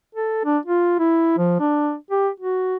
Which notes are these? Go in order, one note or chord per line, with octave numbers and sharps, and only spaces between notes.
A4
D4
F4
E4
F3
D4
G4
F#4